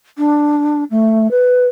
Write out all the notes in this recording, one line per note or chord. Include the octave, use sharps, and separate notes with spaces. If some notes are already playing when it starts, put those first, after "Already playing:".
D4
A3
B4